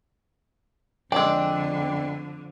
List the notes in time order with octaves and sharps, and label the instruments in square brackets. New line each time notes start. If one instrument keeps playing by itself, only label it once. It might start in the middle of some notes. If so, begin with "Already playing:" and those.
[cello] F2 D3 [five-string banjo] G#3 D4 [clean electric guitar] D5 [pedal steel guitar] G5 E6